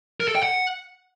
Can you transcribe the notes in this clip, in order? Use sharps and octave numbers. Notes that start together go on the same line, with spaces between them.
A#4
A4
G5
F#5